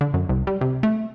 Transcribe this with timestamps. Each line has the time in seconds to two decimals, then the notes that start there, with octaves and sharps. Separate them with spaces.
0.01 D3
0.14 F#2
0.29 C2
0.47 G3
0.61 C3
0.83 A3